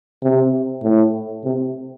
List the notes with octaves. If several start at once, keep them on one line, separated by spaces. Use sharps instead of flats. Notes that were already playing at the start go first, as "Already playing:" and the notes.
C3
A2
C3